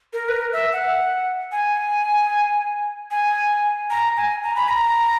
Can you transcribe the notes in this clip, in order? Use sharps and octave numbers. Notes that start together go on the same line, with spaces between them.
A#4
B4
A#4
E5
F#5
G#5
G#5
A#5
G#5
A#5
B5
A#5